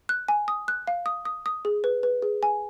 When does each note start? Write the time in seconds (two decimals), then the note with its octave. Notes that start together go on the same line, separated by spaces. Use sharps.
0.09 F#6
0.28 G#5
0.48 D#6
0.68 F#6
0.87 F5
1.06 D#6
1.25 D#6
1.46 D#6
1.65 G#4
1.84 B4
2.03 B4
2.22 G#4
2.43 G#5